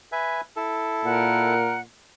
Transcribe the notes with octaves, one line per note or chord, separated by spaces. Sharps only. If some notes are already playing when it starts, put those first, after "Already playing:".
B4 E5 G#5
E4 A4
A#2 A#4 F#5